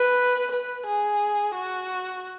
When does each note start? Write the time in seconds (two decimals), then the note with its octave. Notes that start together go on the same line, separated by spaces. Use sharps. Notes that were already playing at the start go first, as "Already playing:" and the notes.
Already playing: B4
0.52 B4
0.86 G#4
1.55 F#4